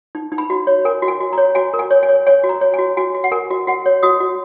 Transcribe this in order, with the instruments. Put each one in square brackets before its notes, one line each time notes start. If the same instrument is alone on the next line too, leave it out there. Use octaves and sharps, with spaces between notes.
[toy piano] D#4
D#4
B5
F#4
C#5
A#4 G#5
F#4
G#5
F#4
A#5
C#5
F#4 G#5
A#4
G#5
C#5
G#5
C#5
C#5 G#5
F#4
A#5
C#5
F#4 G#5
F#4 G#5
F#4
F#5
A#4 G#5
F#4
F#4 F#5
C#5
F#4 D#6
F#4